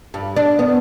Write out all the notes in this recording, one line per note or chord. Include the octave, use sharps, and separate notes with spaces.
G2
D4
B3